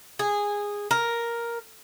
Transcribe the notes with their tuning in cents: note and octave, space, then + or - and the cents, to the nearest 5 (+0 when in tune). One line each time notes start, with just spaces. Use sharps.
G#4 -15
A#4 +5